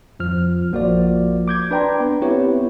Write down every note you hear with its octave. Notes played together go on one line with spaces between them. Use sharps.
F2 F3 F6
A#1 F3 A#3 F#4 C5 D5
D6 G6 G#6
D4 B4 D5 G5 A#5 C6
B3
B3 C4 E4 G4 B4 C#5